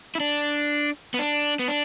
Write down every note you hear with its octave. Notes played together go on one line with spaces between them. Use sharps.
E4
D4
B3
D4
B3
D4